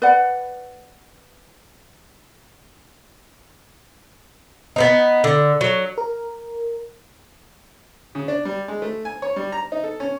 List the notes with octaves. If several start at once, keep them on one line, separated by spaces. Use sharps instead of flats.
B4 D5 F#5
B3 C4 D#4
D3
F#3
A#4
C#3
D4
G3
G#3
A3
G#5
C#5
G3
A#5
D#4
A4
C#4